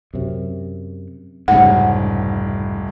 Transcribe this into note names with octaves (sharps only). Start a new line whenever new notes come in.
F#2 C3
F1 C2 G#2 C#3 F#5